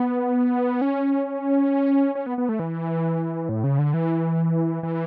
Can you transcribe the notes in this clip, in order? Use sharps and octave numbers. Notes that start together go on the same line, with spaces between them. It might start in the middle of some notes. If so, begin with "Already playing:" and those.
Already playing: B3
C#4
C#4
B3
B3
A3
E3
A2
C#3
D3
E3
E3